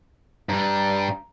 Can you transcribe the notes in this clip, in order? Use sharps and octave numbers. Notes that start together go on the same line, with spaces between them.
G2 G3 A#5